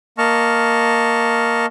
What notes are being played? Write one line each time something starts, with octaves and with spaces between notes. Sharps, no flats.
A#3 D#5 A5 C#6 F6